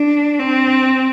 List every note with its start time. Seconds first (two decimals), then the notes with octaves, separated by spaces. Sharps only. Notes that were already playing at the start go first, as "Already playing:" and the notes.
Already playing: D4
0.39 C4